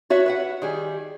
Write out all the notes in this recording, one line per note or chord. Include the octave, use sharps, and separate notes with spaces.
F#4 C#5 E5
B4 E5 F#5
D#3 G3 G#4